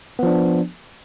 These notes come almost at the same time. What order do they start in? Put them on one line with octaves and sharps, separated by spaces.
B3 F3 D4